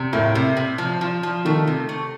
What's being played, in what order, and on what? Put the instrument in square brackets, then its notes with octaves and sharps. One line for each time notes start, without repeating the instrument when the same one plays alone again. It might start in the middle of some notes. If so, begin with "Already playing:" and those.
Already playing: [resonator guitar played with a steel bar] C3
[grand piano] A2 [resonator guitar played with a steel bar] A#3
[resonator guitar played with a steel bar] C3
C3
F3
F3
F3
[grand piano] D#3 [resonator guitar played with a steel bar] A3
[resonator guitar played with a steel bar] C3
A3